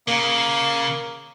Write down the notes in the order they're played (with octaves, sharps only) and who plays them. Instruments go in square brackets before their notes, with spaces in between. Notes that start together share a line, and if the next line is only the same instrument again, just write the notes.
[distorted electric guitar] C#3 [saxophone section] A#3